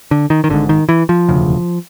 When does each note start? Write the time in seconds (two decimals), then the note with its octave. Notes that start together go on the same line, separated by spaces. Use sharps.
0.11 D3
0.30 D#3
0.44 D#3
0.50 G#1 G#2 D3
0.69 D#3
0.89 E3
1.09 F3
1.28 E1 D2 C#3